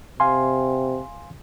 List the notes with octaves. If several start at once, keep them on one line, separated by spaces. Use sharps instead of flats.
C3 F5 G#5 C6